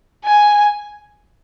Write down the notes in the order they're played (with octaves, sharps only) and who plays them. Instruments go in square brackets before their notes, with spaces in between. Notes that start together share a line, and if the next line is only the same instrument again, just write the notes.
[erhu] G#5